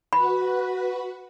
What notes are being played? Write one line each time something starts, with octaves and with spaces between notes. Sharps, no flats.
F#4 B4 B5